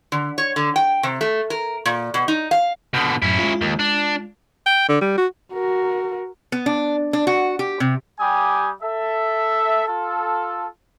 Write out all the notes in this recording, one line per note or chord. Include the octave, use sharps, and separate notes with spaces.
D3
C#5
D3
G5
C3
A3
A#4
A#2
B2
D#4
F5
B2 D3 D#6 F6 G6
F#2 A2 F#3 C#4 E4
G#3 F4
D#2
D4
G5
D3
G3
F#4
F#4 A#4
B3
D4
D4
F#4
G4
C3
G3 G4 G#5 D#6
A4 E5
F4 A4